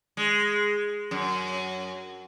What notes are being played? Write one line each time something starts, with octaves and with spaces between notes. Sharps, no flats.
G#3
F#2